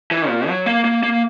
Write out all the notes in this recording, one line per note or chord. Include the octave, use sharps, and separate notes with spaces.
E3
A#2
F#3
A#3
A#3
A#3